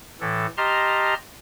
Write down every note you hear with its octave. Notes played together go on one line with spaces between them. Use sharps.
A2 E3 A4
G4 D#5 A5 A#5 C6 F6